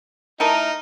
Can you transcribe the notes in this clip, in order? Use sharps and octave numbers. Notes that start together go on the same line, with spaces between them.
A3 D#4 E4 A#4